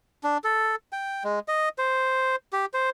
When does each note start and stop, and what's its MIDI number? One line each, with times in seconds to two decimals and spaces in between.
0.24 0.38 62
0.44 0.75 69
0.92 1.23 79
1.24 1.39 56
1.48 1.69 75
1.78 2.36 72
2.53 2.66 67
2.74 2.90 72